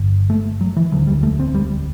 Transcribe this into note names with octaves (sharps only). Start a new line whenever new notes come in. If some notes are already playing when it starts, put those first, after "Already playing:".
Already playing: G1 G2 D3
A3
F#3
E3
E1 D2 D3 F#3
G3
A3
C4
G3